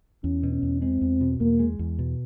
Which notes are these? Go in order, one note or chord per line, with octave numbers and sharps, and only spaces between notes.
E2 C#4
B2
C#4
E2
G#3 C4
E2
B2
E2 A#3
G#3
E2
B2